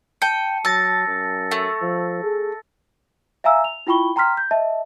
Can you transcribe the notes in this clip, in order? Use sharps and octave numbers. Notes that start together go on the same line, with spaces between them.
G5 A5 C#7
F#3 A5 E6 A6 A#6
F#2
A3
F3
G#4
E5 F5 G#5 A#5 E6
F7
E4 F4 G5 B5 C#6 G7
G5 A#5 C6 F6 B6
G6
D#5 E5 A5